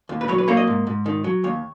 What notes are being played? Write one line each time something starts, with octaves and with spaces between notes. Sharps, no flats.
D#2
B4
F#3 C#5
B4
A#3 C#5
D#5
G#2
G#2
D#3
F#3
D#2 C#5